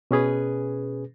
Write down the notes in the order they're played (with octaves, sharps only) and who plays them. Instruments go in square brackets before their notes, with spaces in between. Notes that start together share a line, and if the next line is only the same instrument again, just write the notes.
[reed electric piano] B2 C#4 G#4 B4